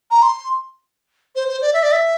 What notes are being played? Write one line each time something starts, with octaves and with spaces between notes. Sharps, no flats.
A#5
C6
C5
C5
D5
E5
D5
E5